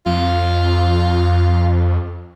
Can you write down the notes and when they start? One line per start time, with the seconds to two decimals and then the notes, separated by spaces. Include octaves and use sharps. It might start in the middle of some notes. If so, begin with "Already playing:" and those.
0.06 F2 F4